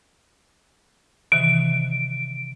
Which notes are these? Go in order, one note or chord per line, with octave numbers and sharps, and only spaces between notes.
C3 D#3 E3 D7